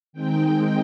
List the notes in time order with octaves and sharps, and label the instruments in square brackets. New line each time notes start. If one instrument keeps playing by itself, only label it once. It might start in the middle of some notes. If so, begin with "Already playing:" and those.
[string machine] D#3 G#3 C4 D#4 G5